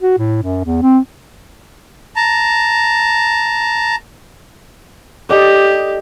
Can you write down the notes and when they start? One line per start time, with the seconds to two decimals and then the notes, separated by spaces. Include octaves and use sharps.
0.01 F#4
0.18 A2
0.43 F#2
0.64 E2
0.82 C4
2.16 A5 A#5
5.29 G4 A4 D5 D#5